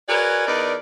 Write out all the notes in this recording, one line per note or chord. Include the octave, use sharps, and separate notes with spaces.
F#4 G#4 A#4 B4 C#5 D5
E2 D#4 A#4 B4 D5